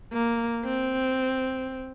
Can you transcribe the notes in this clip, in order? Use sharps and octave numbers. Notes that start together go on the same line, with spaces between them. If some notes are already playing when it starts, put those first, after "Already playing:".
A#3
C4